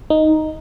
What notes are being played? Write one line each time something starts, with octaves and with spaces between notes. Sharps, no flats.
D#4